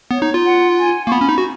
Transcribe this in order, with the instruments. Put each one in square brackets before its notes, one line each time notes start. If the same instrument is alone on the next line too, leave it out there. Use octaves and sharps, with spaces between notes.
[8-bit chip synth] B3 [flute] C#5
[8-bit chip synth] D#4
F4
[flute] F#5
G#5
[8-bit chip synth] A#3 [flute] C#6
[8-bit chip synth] B3 [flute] B5
[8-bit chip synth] C#4
D#4
F#4